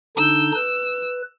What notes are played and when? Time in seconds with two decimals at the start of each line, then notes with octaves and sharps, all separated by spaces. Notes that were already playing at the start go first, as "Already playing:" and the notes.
0.17 D3 D4 D#4 E6 G6
0.55 B4 E6